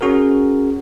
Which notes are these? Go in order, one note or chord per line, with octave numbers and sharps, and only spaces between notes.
C#4 F#4 G#4 A#4